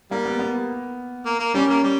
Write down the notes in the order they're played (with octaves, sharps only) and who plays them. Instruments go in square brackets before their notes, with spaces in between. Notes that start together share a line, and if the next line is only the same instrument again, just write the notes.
[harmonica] G3 [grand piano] A#3
[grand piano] B3
B3
[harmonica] A#3
A#3
[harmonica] G3 [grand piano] C#4
[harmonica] A#3
G3